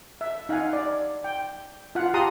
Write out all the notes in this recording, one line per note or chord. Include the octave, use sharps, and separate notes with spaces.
E5
D#4 F5 F#5 G#5
D5
G5
F4 F5 F#5
G4 A5 A#5 C6 D#6